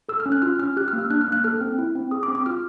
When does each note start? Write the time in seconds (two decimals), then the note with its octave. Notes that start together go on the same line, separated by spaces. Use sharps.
0.09 A4 E6
0.20 F6
0.26 C#4
0.32 F#6
0.42 F4 F6
0.59 C#4 F6
0.77 G4 F#6
0.88 F6
0.93 A#3
0.99 E6
1.10 D4 F#6
1.21 F6
1.28 A#3 F#6
1.44 A4 F6
1.61 C4
1.79 E4
1.95 C4
2.11 G#4 D#6
2.23 D6
2.28 C4
2.35 D6
2.46 F4 F6